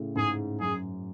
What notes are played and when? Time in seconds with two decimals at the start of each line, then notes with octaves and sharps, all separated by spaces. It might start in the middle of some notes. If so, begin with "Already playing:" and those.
Already playing: A2 C#3
0.16 G#2 G#4
0.60 F#2 G#4